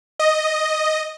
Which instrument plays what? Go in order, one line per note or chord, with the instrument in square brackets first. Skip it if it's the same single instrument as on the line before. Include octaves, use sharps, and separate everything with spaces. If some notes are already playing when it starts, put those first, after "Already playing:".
[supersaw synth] D#5